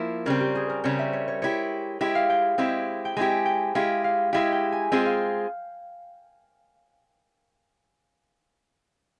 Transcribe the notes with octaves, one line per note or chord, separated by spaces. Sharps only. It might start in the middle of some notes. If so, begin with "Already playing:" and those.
Already playing: F3 A#3 E4
C#3 G3 C4 A#4
G4
G#4
A#4
C#3 G3 C4 C#5
E5
C#5
C#5
G#3 E4 G4 C#5
G#3 E4 G4 E5
F5
G5
G#3 C4 E4 G4
G5
G#3 C4 E4 G4 G#5
G5
G#3 E4 G4 F5
F5
G#3 E4 G4 F5
G5
G#5
G#3 C4 F4 G#4 G5
F5